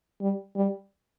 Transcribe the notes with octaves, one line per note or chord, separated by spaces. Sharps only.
G3
G3